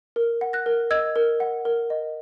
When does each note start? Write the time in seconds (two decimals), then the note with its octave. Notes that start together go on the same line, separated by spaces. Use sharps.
0.16 A#4
0.41 F#5
0.53 F#6 A#6
0.66 A#4
0.91 D#5 E6 G#6
1.16 A#4
1.40 F#5
1.65 A#4
1.90 D#5